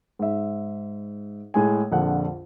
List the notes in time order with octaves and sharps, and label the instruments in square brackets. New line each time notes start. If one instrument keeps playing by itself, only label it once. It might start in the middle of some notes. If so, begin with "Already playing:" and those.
[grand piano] G#2 E5
A2 G#3 G#5
A#1 F2 D3 F#5